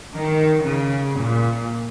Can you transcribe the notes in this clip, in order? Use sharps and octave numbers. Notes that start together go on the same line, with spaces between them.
D#3
C#3
A#2